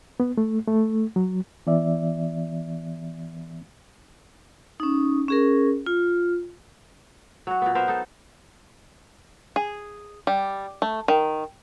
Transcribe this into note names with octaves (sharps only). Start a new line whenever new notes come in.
B3
A3
A3
F#3
E3 B3 D5 E5
C#4 D#4
C#4 G#4 A#4
F4
F#3 F#4
A#2 B3
B3 A#4 C5 E5
D#4 A4
G#4
G3
A3
D#3